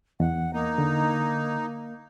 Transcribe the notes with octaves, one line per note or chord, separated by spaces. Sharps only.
E2 F#5
A#3 D#4
D3